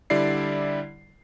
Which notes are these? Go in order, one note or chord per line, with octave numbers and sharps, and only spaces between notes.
D3 G3 E4 D5 C7